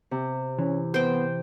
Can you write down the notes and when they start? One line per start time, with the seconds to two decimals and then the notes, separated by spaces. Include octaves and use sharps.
0.11 C3
0.59 E3 C#4
0.94 B3 C5 G5